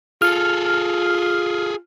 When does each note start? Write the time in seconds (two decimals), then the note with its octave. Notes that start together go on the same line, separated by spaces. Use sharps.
0.22 F4 G#4 A4 F6